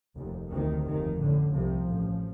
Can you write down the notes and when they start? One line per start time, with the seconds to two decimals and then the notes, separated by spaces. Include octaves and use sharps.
0.16 F1 D#2
0.51 D2 C3 D#3
0.85 F1 D#2 D#3
1.19 A1 A2 D3
1.54 C2 C3 F3
1.89 A1 A2